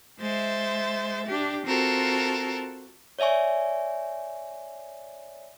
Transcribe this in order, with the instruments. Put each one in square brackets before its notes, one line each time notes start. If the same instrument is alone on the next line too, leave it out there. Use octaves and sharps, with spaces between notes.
[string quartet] G#3 C5 E5 A6
D4 G4
C4 F4 F#4 A4 A#4
[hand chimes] C#5 D5 E5 G#5 C#6